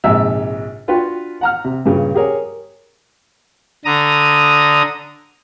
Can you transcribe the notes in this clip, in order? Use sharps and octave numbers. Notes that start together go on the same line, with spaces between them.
A#1 G#2 C3 D#4 E5 E6
D4 F4 F#4 B4 G5
F#5 A#5 F6
C3
G2 A#2 C#3
G4 G#4 A#4 C#5
D3 A#5 D#6